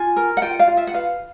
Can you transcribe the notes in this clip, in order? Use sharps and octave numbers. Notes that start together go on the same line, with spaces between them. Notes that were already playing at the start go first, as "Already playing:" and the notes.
Already playing: F4 G#5
A#4
F#5
F4 G5
F5
F4
E5
F#5
B4 F5